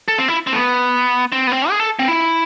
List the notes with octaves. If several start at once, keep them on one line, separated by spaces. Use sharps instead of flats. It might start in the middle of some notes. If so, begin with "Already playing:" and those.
A4
C4
E4
C4
A3
B3
C4
B3
C4
G#4
A4
C4
E4